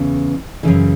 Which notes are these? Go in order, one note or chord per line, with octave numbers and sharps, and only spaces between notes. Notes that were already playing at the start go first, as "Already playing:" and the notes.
Already playing: E2 C#3 E3
F#2 C#3 E3 C#4